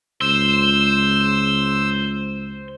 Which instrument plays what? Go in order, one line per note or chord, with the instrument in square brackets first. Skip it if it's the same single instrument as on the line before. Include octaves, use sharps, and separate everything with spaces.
[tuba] C#2 [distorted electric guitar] C5 [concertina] E6